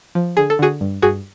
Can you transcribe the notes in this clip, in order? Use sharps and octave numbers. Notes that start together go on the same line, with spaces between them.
F3
D3 G#4
A4
D3 F#4 G#4
G2
G2 F#4 G#4